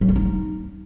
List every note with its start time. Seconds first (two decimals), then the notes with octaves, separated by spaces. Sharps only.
0.01 F#3
0.08 A#3
0.16 D#4